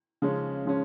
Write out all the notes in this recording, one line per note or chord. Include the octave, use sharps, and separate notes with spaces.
C#3 F3 G#3 C#4
C#3 F3 G#3 C#4